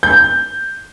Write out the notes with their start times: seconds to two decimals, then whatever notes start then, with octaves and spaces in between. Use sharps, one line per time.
0.03 G6